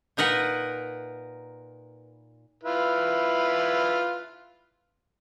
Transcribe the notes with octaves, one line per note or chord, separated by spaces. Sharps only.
A#2 D#4 A#4 B4 F#5
E4 F4 B4